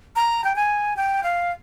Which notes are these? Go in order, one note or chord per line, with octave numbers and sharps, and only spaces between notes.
A#5
G5
G#5
G5
F5